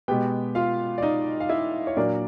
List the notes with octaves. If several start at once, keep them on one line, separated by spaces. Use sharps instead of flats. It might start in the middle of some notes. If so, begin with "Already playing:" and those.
B2 G#3 B3 G4 G5
F4 F5
D5
D#4 D#5
F5
E4 E5
C#5
A#2 F#3 A#3 D4 D5